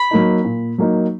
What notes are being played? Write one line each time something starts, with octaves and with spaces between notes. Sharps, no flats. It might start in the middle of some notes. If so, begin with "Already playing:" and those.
Already playing: B5
F#3 A#3 D#4
A#2
F#3 A#3 D#4